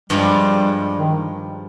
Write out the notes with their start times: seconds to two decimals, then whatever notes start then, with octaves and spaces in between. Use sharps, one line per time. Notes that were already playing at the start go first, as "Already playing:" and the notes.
0.09 G2 F3 G3 G#3
0.97 D#3